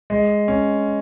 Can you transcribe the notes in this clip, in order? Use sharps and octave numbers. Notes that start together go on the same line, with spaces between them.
G#3
C#4